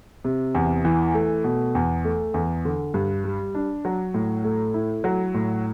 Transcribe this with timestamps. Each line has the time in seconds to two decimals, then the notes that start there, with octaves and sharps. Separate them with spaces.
0.25 C3
0.55 E2
0.85 E3
1.14 A3
1.44 B2
1.75 E2
2.05 A3
2.34 E2
2.65 D3
2.94 G2
3.24 G3
3.55 D4
3.85 F#3
4.14 A2
4.44 A3
4.74 E4
5.04 F#3
5.34 A2